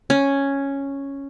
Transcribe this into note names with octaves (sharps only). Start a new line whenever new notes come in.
C#4